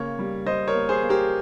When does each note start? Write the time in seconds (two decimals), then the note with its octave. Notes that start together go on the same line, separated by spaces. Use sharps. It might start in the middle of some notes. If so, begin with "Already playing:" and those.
Already playing: C#3 A#3 C#5
0.19 G3
0.46 G3 C5 D#5
0.67 A#4 C#5
0.74 A#3
0.89 G#4 C5
1.03 A#3
1.09 G4 A#4